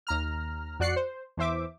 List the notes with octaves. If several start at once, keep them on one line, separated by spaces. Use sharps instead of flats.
D#2 A#5 F6
F2 F#4 D5 F#6 C7 C#7
C5
E2 E3 C5 E5 D6